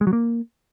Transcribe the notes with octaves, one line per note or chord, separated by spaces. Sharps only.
G#3
F#3
A#3